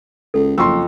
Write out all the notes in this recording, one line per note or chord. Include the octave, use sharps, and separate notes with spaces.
C#2 A4
F#1 F2 C6 C#6 E6